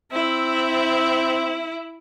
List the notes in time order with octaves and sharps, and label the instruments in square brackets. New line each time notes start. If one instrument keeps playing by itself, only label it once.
[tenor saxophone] C4 [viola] E4